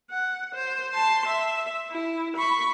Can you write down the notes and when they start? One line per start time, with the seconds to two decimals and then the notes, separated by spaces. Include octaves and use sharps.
0.10 F#5
0.55 C5
0.92 A5 C6
1.28 E5
1.91 E4
2.36 B5 C#6